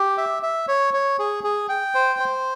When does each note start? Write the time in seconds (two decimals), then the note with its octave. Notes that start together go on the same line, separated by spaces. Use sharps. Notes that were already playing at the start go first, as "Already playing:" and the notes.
Already playing: G4
0.18 E5
0.43 E5
0.68 C#5
0.94 C#5
1.19 G#4
1.44 G#4
1.69 G5
1.95 C5
2.19 C5